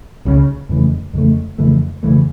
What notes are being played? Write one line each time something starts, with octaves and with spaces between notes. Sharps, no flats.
C#2 C#3 F3 C#4
F2 C#3 E3 A3
F2 C#3 E3 A3
F2 C#3 E3 A3
F2 C#3 E3 A3